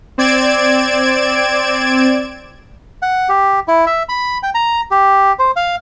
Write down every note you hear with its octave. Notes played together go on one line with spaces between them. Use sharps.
C4 D5 G#6 D7 E7
F#5
G4
E4
E5
B5
G5
A#5
G4
C5
F5